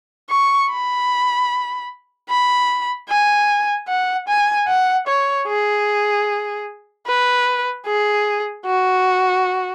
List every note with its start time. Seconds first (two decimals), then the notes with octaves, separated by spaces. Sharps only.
0.30 C#6
0.70 B5
2.29 B5
3.09 G#5
3.88 F#5
4.28 G#5
4.68 F#5
5.07 C#5
5.47 G#4
7.07 B4
7.86 G#4
8.66 F#4